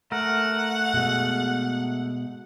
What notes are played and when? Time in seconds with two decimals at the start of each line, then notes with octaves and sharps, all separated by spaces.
0.12 A3 A#4 F#5
0.94 B2 G#3